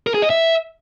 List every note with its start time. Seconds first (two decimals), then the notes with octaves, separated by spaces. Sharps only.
0.07 A#4
0.14 G#4
0.22 D#5
0.30 E5